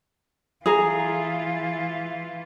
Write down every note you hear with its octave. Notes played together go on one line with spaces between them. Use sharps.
E3 F4 G#4 A#5